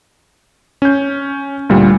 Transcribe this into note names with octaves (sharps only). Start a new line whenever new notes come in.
C#4 G6
D2 A#2 G3